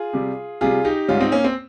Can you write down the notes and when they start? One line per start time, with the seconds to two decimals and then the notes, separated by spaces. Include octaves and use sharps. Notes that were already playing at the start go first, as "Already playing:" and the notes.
Already playing: F4 G#4
0.13 C3 G3
0.61 C3 G3 F4 G#4
0.85 D#4 G4
1.08 G#2 G3 C#4 F4
1.20 C4 D#4
1.32 A#3 C#4
1.44 C4